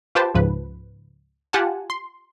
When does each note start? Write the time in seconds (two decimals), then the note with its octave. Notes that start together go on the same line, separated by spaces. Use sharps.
0.15 F4 G4 B4 C5 G5 A5
0.34 C#2 G#2 F3 B4
1.53 F4 G4 F#5 G#5 A5
1.90 C6